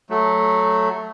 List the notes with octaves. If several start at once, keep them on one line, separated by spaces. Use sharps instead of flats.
F#3 A3